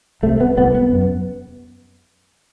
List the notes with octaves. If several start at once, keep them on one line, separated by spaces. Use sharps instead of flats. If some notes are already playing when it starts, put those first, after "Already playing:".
C2 C3 A3
B3
C2 C3 B3
B3
F#2